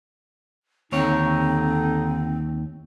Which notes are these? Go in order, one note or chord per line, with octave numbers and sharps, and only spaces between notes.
D#2 D3 C4 D#4 C#5